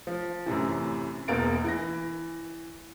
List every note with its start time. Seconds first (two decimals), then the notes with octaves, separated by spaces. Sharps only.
0.07 F3
0.46 F#2 A2 C3 E3
1.28 E1 E2 A#3 A6 D7
1.64 E3 A#6